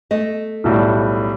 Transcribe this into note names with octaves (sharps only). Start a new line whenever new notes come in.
A3 D#5
B1 A2 G3